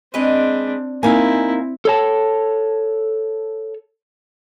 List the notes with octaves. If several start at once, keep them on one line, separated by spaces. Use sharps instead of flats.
G#3 C4 D4 B4 D#5
A#3 C4 D#4 E4 F5 G#5
A4 C#5 A5